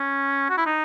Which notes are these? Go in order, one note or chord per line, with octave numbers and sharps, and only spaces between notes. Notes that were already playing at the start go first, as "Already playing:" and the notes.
Already playing: C#4
F#4
E4
D#4